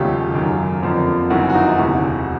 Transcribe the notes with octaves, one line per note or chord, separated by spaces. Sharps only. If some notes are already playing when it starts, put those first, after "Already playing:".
Already playing: E1 D#2 C#3 F#3 A3 F4 G4
F#2 D#3 F#3
F2 D3 F3 A#3
G1 F#2 D#3 F#3 E4 F#4
F#4
D#4 F4
E1 D2 C3 E3 E4 F#4